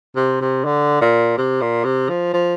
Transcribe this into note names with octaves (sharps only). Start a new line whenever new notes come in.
C3
C3
D3
A#2
C3
A#2
C3
F3
F3